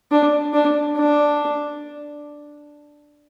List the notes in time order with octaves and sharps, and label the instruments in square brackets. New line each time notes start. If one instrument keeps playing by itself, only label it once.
[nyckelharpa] D4
D4
D4